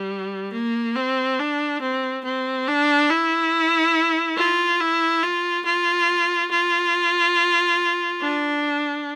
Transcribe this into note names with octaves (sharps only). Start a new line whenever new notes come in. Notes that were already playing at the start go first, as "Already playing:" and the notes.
Already playing: G3
A#3
C4
D4
C4
C4
D4
E4
F4
E4
F4
F4
F4
D4